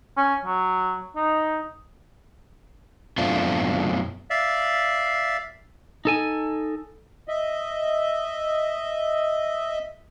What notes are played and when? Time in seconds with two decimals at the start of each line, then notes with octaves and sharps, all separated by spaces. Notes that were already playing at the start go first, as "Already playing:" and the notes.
0.17 C#4
0.45 F#3
1.16 D#4
3.18 F#2 B2 A3 C4 D4 F4
4.30 D5 E5 F5
6.05 D#4 A4 G#5
7.28 D#5 E5